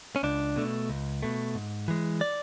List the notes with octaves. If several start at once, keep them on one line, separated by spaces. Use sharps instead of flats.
C#4
C#2 D4
B2 A3
C#2
B2 A3
G#2
E3 G#3
D5